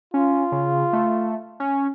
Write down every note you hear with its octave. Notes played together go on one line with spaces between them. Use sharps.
C#4 F4
C#3
A3
C#4